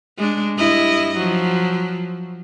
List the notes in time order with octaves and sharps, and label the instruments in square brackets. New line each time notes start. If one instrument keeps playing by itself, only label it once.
[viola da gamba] G#3 D4
G2 E4 D#5
F3 F#3